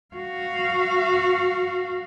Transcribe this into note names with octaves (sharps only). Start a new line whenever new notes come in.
F#4 F5